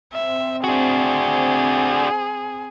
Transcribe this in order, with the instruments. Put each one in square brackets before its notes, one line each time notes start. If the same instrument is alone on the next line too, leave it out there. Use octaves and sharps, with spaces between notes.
[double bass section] C4 [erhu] E5
[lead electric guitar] D4 F#4 [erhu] G#4